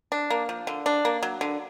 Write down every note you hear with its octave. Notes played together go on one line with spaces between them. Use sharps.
D4
A#3
F3
D3
D4
A#3
F#3
D3